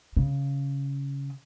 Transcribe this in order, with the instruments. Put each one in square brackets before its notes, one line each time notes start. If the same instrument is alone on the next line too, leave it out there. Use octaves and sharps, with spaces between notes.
[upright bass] C#3